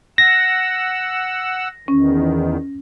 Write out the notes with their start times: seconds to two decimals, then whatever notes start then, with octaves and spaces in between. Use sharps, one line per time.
0.18 F#5 E6 A#6
1.88 E2 D#3 C#4